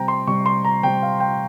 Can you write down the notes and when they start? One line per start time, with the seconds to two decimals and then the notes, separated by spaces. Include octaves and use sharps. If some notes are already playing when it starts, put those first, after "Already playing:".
Already playing: C3 G3 C4 G5 A#5
0.08 C6
0.27 C3 G3 C4 C#6
0.46 C6
0.65 A#5
0.83 C3 G3 C4 G5
1.03 F5
1.20 G5